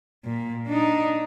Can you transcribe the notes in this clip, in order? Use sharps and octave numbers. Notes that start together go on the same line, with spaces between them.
A#2
D4 D#4